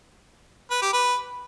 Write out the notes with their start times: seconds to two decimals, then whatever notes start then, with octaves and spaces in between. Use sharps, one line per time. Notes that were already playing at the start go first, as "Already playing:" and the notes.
0.71 B4
0.82 G4
0.93 B4